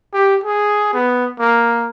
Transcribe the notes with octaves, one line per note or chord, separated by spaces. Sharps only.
G4
G#4
B3
A#3